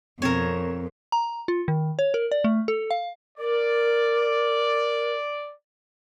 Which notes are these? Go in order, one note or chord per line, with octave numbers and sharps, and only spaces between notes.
F2 B2 C4 A#4 C#5 E7
A#5
F4
D#3
C#5
A#4
D5
A3
A4
F5
A#4 D5